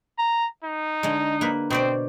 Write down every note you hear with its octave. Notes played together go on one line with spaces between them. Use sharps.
A#5
D#4
D3 G#3
A#3 B4
B2 C4 C5 D5